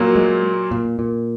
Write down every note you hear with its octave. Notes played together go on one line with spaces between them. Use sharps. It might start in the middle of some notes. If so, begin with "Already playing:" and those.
Already playing: A#2 F#3 A#3
G#3
A#2
A#2